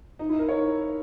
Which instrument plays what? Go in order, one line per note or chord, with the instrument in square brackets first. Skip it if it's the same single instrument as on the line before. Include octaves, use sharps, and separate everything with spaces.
[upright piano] D#4
E4
A#4
C#5